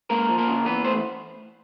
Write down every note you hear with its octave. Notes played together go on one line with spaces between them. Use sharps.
G#3 A#3 A#4
F3
A#3 A#4
C#3
E3 B3 B4
A3 C5